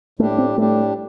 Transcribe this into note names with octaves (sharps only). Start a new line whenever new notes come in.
A2 G3 A3 D4 G4
C4
A2 G3 A3 D4 G4